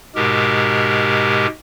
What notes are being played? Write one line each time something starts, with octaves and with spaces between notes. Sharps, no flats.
G#2 B2 G#3 G4 A#4